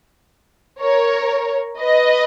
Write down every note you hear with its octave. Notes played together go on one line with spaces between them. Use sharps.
A#4 C#5
B4 D#5